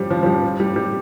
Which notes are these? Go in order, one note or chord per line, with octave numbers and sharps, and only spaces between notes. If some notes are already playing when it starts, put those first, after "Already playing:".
Already playing: F3 G3
F3
F3
G3
G3
G3